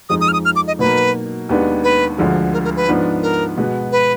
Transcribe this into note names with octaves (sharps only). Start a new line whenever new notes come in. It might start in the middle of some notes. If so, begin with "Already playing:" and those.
F2 F3 G#3 D#4 D#6
D#6
F6
D#6
F6
D6
D#5
B2 F#3 A#3 D#4 B4
D#2 D#3 G#3 B3 D4
B4
D2 D3 F3 G#3
A#4
A#4
B4
G#2 F3 B3 D4
A#4
B2 G#3 B3
B4